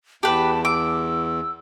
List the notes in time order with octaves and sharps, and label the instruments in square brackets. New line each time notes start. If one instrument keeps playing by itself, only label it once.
[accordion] E2 [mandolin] G4 B4 [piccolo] A5
[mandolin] D6 [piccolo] E6